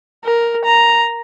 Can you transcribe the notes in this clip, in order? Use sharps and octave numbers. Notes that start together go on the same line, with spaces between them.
A#4
A#5